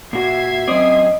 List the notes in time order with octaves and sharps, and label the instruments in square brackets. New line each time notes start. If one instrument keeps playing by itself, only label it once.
[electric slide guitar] A#2 F#4 [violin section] E5 G#6 C7
[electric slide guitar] F#2 D5 [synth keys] C4 D#6 [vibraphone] D#5